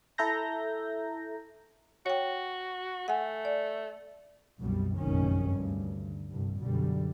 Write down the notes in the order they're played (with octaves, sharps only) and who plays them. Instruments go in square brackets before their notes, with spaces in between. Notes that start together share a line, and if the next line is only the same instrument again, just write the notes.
[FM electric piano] E4 A4 E5 A#5 G6 A#6
[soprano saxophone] F#4 [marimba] C#5 G5
[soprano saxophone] A3 [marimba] F#5 G#5
[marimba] D5
[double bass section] C2 F#2 B2 G3
F1 A#1 F#2 D#3 C#4
D2 G2
C2 G2
F#2 B2 D3 G3